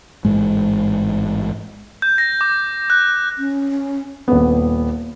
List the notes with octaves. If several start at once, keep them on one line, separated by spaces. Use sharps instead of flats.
A1 G#2 G#3
G6
A#6
D6
F#6
C#4
D#1 B3